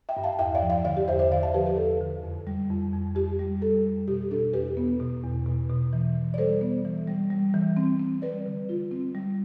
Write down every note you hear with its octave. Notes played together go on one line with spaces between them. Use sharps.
E5 G5
G2
F5 A5
E2 E5 G5
D5 F5
F3
D5 F5
D3 D5 F5
G4
E2 C5 E5
C5 E5
D3 D5 F5
F5 A5
F3 G4 B4
G4 B4
E2 A4
D3
F2
G3
F2
F2
F2 G4
G3
G3 A4
F2
B2 G4
D4 A4
E2 G4 B4
B3
B2
E2
B2
B2
E3
E3
D5
G3 A4 C5
B3
E3
G3
G3
E3
C4
C4
G3 B4 D5
D3
F4
C4
G3